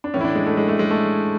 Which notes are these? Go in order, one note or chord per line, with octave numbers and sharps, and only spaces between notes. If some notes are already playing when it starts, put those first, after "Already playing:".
D4
A2 E3 C#4
E4
D4
G#3
A3
G#3
A3
G#3
A3